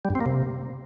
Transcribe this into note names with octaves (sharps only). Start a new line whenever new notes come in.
G3
G2
C4
A#3
C3